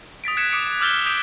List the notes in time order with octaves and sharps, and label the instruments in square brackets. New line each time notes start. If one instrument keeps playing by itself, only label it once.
[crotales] D#6 A6 B6 D7
F#6 G#6 B6 C#7 E7
D6 D#6 C#7 D7
D6 E6 F6 G6 A6 G7
D6 D#6 G6 B6 D7 E7